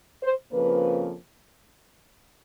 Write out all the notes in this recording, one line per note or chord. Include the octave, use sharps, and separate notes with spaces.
C5
F2 C#3 F3 A#3 B4